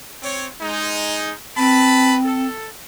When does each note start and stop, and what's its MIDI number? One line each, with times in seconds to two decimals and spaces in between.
0.23 0.46 60
0.23 0.46 73
0.61 1.32 56
0.61 1.32 63
1.57 2.47 60
1.57 2.16 71
1.57 2.16 81
1.57 2.16 83
2.24 2.67 69